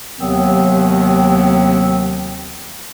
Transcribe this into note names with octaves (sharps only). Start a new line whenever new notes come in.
D#2 C3 D#3 F#3 B3 C4